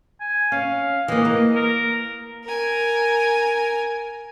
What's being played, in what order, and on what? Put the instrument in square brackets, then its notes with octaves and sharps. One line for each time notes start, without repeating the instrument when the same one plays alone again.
[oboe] G#5
[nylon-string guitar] C#4 [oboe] F5
[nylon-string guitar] E3 A#3 [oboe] D#5
[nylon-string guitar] A#3
[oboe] A#4
[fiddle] A#4 G#5